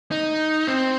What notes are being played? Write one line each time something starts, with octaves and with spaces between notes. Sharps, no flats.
D#4
C4